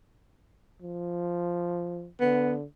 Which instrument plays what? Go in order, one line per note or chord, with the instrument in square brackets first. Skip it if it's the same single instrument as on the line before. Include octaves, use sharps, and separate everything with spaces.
[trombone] F3
[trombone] D3 [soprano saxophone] B3